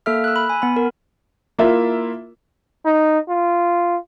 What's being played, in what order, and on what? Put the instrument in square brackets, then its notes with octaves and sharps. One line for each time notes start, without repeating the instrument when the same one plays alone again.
[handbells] A#3 A4 E5 F6
E6 F#6
B5
G#5
B3 B5
A#4
[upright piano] A#3 E4 F4 A#4 E5
[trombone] D#4
F4